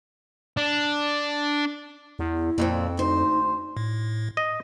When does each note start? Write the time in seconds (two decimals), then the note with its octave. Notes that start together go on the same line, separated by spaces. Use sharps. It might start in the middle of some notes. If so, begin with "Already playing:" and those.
0.57 D4
2.19 E2 E4
2.58 F2 A#2 F3 C4
2.97 D2 D#4 C5
3.77 A2
4.37 D#5